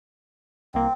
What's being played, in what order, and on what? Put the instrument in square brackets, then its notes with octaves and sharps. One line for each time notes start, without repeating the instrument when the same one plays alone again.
[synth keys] C2 A#3 [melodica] C4